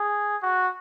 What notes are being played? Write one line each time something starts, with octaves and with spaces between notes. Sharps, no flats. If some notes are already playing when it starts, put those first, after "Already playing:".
Already playing: G#4
F#4